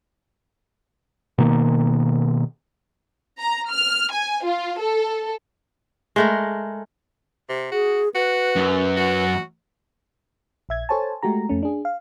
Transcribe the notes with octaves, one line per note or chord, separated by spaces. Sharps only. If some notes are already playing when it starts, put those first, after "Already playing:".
B2 D#3 A#3
A#5
F6
G#5
F4
A4
G#3 A3 A#4
C3
F#4 G#4
F#4 B4
F#2
F#4
A#1 E5 G#6
A4 C5 C#5 G#5 A5
G#3 A3 F#4 G4 A#5
F2 A3 C#4
D4 G#4
F5